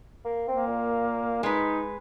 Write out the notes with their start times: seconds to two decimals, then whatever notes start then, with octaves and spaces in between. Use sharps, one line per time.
0.25 A#3
0.48 A#3 C4
0.67 A#2
1.43 G#3 D#4 B4